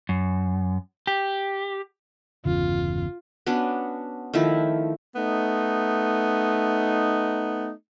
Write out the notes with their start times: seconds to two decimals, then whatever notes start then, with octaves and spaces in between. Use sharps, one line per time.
0.09 F#2
1.07 G4
2.45 G1 E2 C#3 F4
3.46 B3 C#4 D4 F#4
4.33 D#3 F3 A3 E4
5.16 A3 B3 D#4